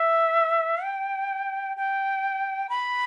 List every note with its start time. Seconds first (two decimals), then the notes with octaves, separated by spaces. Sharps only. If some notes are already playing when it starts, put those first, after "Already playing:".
Already playing: E5
0.83 G5
1.77 G5
2.69 B5